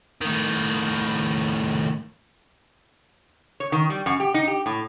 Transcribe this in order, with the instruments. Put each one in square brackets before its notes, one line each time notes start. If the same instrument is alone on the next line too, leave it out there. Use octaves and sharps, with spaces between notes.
[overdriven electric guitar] A2 D#3
[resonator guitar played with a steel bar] C#5
D#3
G3
F#2
G4
D#4
G4
A2